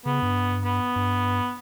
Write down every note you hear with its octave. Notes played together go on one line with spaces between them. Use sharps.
C#3 B3
G2
B3
G2